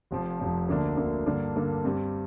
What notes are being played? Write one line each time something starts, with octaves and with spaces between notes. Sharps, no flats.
F1 F2 F3
F1 F2 F3
D2 D3 A#3 D4
D2 D3 A#3 D4
G2 D3 A#3 D4
G2 D3 A#3 D4
G2 G3 C4